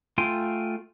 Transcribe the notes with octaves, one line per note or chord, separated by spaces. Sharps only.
A3 F4 G5 G#5 C6